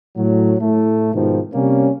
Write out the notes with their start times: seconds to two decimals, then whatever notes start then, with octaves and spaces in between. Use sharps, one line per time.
0.17 A2 F#3
0.60 A2 A3
1.14 G#2 B2 D#3 F3
1.54 C3 G3 A#3 C#4